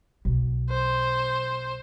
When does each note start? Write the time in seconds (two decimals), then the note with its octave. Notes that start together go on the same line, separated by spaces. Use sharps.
0.25 B1
0.71 C5